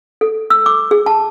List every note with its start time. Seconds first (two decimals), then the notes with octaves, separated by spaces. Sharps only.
0.21 A4
0.50 E6
0.66 D6
0.91 G#4
1.06 A5